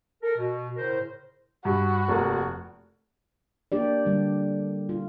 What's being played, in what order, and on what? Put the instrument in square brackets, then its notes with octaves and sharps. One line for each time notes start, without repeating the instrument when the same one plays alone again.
[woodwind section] A4 A#4
B2
A2 C#3 A#4 C5
[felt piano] G2 [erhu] F#4
[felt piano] F1 A#3
[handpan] A#3 D4 G4 D5
D3 G3 D4
F4